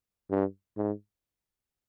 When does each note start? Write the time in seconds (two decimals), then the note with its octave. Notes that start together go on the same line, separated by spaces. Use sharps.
0.30 G2
0.77 G#2